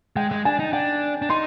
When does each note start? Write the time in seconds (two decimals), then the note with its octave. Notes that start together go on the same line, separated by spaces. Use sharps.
0.16 G#3 G5
0.31 G#3
0.45 D4 G#5
0.59 D#4
0.73 D4 G5
1.22 D4
1.30 D#4 C6